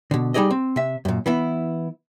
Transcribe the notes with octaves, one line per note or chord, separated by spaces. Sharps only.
B2 D3
G3 D#4 G#4 D5 D#5
C4
C3 E5
F#2 A#2
E3 B3 E4